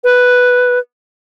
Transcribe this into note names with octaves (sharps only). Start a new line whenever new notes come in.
B4